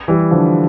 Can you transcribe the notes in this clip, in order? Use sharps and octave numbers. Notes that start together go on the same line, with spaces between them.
E3 G3
D3 F3